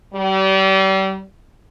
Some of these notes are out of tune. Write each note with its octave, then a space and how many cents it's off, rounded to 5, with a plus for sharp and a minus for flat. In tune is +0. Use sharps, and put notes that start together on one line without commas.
G3 -35